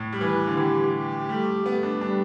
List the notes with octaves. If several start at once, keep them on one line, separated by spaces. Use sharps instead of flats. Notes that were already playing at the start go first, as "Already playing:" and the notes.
Already playing: A2
G3
E3 B4
D3
E3 G4
G4
G3 A3
A3 B3
D4
G3 D4